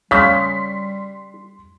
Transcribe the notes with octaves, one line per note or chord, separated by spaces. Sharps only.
C#3 G3 C6 B6